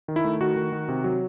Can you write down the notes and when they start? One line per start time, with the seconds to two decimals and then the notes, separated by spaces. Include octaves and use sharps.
0.08 D#3
0.16 E4
0.24 A3
0.41 D#3 F#4
0.56 D#3
0.72 D#3
0.89 C3
1.04 F#3